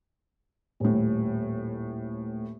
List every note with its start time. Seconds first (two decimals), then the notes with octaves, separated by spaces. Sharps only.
0.80 D#1 A2